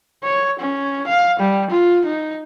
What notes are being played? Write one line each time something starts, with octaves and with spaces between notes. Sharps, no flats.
C#5
C#4
F5
G3
F4
D#4